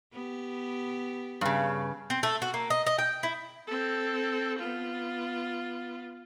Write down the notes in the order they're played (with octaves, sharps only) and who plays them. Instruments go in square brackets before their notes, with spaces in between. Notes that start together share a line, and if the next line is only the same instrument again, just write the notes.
[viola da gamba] B3 G4
[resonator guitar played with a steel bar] G2 C#3
[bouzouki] C4
A3
F#4
A#3
D#5
D#5
G5
E4
[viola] C4 A4
B3 F4